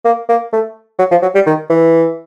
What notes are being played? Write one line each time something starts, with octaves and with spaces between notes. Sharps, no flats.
A#3
A#3
A3
F#3
F3
F#3
G3
D#3
E3